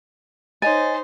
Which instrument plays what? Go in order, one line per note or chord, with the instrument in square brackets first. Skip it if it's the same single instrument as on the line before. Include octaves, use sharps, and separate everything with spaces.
[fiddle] D#4 C5 [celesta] C#5 D#5 A6 [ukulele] G#5